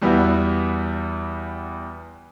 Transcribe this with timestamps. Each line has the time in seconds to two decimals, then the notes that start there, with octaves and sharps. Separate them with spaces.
0.02 E2 G3 B3 E4 F#4